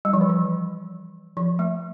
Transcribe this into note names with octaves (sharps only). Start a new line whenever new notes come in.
G3
F3
E3
F3
F3
A3